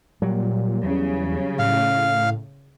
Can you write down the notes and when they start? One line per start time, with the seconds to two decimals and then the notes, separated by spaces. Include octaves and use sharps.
0.22 A#2 F#3 G3
0.84 E2 C#3
1.59 A2 F5